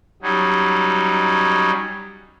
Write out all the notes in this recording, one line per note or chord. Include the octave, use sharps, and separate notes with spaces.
F#3 G3 C#4 D#4